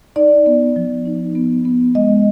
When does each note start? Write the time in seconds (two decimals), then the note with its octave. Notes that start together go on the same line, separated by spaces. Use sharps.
0.16 D#4 D5
0.46 B3
0.76 F3
1.05 D#4
1.36 B3
1.65 B3
1.95 G#3 D#5